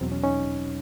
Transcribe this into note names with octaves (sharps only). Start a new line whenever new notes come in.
E2 B2 F#3 C4
C#4
C#4 D#4